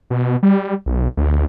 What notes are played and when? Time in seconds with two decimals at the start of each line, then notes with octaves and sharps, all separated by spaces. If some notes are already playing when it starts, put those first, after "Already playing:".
0.10 B2
0.43 G3
0.86 B1
1.17 D2